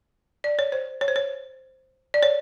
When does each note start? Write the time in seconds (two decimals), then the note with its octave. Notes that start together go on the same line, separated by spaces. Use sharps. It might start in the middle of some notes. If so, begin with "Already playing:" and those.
0.44 D5
0.59 C#5
0.72 C5
1.01 C#5
1.08 C5
1.16 C#5
2.14 D5
2.23 C#5